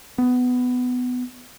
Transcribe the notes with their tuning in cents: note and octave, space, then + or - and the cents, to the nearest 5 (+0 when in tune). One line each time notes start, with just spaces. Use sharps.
B3 +15